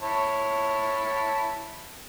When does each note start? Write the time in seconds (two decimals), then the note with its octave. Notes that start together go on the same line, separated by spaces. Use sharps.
0.02 E4 C#5 A5